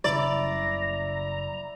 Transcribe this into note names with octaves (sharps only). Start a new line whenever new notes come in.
F#1 C#3 G3 E4 D5 A#5